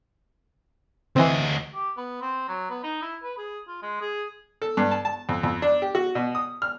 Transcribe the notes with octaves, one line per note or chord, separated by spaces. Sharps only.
D2 E3 C4 D#5
G4
B3
C4
F#3
B3
D#4
E4
B4
G#4
F4
G#3
G#4
A4
G2
A5
A5
F2
F2
D4
G4
F#4
B2
D#6
F6